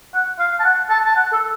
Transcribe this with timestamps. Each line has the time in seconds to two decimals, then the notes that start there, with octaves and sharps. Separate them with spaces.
0.14 F#5
0.39 F5
0.60 A5
0.64 F#5
0.90 A5
1.06 A5
1.16 F#5
1.32 A4